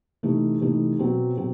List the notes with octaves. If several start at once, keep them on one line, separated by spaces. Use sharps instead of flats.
C3 E3 A3 D#4
C3 E3 A3 D#4
B2 F#3 C4
B2 F#3 C4